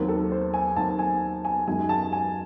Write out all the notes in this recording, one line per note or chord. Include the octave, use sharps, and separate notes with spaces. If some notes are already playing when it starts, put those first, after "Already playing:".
Already playing: D#2 D#3 F#3 C4
A4
C5
G#5
D#2 D#3 F#3 C4 A5
G#5
G#5
F#2 D#3 G#3 D#4 G#5
A5
G#5